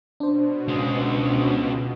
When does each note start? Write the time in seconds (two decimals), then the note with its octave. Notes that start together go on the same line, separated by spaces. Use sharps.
0.20 B2 D4 C5
0.68 C#2 G#3